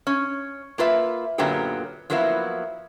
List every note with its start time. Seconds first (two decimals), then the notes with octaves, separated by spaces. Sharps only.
0.07 C#4
0.78 A#3 F4 B4 E5
1.38 F#2 A#2 D3 F#3 B3 G4
2.10 F3 F#3 A#3 B3 E4